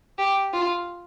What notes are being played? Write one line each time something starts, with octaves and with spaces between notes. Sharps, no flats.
G4
F4